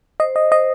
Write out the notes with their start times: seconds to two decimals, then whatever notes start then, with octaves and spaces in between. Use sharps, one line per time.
0.20 C5 D#5
0.36 D#5
0.52 C5 D#5